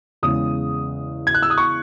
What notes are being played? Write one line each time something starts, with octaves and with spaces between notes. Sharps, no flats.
E2 C#3 G#3 D#6
G#6
F#6
E6
D#6
C#6